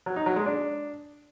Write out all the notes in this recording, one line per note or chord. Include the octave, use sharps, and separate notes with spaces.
F#3
D#4
F#3
G#3
D4